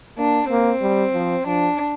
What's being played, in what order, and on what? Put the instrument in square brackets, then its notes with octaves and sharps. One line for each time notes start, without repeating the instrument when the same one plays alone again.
[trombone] A#3 [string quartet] D4
[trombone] A#3 [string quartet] C4
[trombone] G3
F3
[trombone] F3 [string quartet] D4